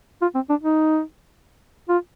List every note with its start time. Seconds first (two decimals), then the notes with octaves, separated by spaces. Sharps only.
0.22 F4
0.35 C4
0.50 D4
0.63 D#4
1.89 F4